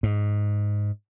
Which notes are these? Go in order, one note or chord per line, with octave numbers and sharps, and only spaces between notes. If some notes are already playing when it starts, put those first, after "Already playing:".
G#2